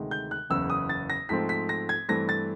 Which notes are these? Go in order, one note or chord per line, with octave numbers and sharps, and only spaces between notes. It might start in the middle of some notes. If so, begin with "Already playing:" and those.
Already playing: D2 C3 D#3 G#3
G6
F#6
F#1 E2 C#3 E6
D#6
A6
A#6
G#2 F3 A3 C4 B6
B6
A#6
G#6
G2 E3 A3 C4 A#6
A6